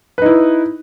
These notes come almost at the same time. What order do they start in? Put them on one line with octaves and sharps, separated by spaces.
B4 D#4 E4